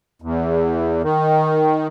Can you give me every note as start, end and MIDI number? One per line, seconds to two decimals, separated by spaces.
0.22 1.02 40
1.03 1.87 51